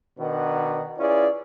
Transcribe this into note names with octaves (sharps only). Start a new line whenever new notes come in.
B2 D#3 D4 D#4 B4 F#5
C#4 E4 F4 G#4 B4 D5